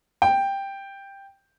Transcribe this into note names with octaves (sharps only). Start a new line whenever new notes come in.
G5